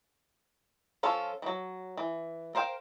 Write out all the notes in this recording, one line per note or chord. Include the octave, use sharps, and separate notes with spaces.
F3 C#4 F4 A4
E3 F#3
E3
A#4 C5 F5 G5